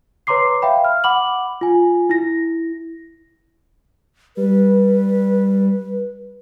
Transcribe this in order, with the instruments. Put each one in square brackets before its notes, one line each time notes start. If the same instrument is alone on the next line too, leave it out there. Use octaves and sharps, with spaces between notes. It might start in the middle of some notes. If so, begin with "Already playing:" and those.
[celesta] B4 C#5 A#5 C6 D6 C7
E5 F5 G5 B5
F6
F#5 B5 D6 F#7
F4 G#5
E4 A#6
[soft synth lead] G3 [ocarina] B4